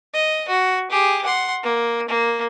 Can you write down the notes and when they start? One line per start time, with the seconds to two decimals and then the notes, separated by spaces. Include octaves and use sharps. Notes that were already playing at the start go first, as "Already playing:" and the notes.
0.13 D#5
0.48 F#4
0.91 G4 G#4
1.25 F#5 C6
1.63 A#3
2.08 A#3